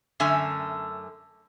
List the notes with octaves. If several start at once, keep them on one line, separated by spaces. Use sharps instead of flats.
F#2 D3 A3 C#4 E5 G#5